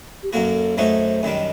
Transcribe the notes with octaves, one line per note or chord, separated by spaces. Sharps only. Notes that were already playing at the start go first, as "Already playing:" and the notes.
G4
F#2 F#3 A#3 F#4 A4
F#2 F#3 A3 D#4 F#4 C5
F#2 D#3 G3 D4 D#5